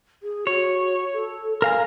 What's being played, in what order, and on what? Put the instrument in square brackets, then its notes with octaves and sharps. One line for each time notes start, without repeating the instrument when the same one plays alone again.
[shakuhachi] G#4
[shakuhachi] F#4 [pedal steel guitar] C#5
[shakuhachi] A4
[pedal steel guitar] A#4 F5 A#5 [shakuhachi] G#5